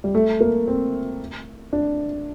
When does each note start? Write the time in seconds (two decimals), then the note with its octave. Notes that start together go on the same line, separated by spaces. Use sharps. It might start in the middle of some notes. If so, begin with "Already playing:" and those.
0.04 G3
0.15 A3
0.41 A#3
0.68 C4
1.73 D4